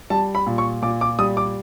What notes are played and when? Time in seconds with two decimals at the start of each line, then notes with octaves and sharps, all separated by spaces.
0.10 G3 A5
0.35 B5
0.47 A#2
0.58 C#6
0.82 A#2 D6
1.01 D6
1.19 G3 D#6
1.37 D6